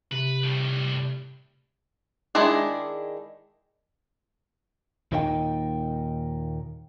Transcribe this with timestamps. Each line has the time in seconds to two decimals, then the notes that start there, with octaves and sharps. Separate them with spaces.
0.12 C3 B4
0.44 A2 G3
2.35 D#3 G#3 D4 E4 G#4
5.12 D#2 A#2 D#3 D#4 F4 G5